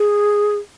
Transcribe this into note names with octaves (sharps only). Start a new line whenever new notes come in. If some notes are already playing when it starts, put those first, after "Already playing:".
Already playing: G#4